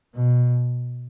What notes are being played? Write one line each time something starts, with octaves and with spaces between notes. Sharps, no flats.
B2